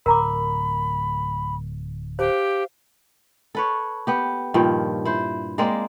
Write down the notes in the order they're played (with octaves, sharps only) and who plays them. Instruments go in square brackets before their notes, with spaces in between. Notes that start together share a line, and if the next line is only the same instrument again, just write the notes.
[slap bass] D1 [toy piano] A#4 A#5 D6 [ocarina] B5
[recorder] G4 [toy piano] C5 [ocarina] F5
[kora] A4 B4 C#5
B3 G4
G2 A#2 D#3 F3
E4 C5
G#3 A#3 C4 D5